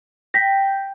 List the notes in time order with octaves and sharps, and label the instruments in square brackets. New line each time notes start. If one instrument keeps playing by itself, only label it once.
[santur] G5 [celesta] A#6 B6